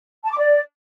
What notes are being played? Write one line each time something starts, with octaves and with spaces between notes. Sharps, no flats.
A5
D6
D5